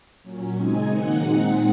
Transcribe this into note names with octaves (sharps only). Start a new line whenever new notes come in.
A#2 F#3 C#4
C#3 G#3 C4 D#4 G#5
D#3 F#3 A#3 D#4 F#5
A#2 G#3 C4 D#4 F#5